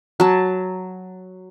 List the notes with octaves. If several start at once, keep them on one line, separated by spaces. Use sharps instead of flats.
F#3 A5